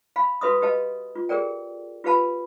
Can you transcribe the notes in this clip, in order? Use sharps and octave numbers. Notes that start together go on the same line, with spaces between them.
F5 B5
F#4 A4 B4 E5 C6 D#6
G4 B4 D#5 F5 A5
F4
G4 G#4 A#4 D5 G5
F4 G4 B4 F5 A5 B5